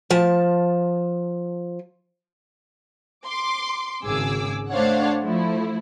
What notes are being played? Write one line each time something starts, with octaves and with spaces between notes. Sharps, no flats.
F3 A5
C6 D6
G#1 C#3 G#4 D6 E6
A3 D4 C5 C#5 F5 F#5
F3 A3 E4